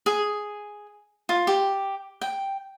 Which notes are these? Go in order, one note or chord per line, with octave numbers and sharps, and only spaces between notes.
G#4
F4
G4
G5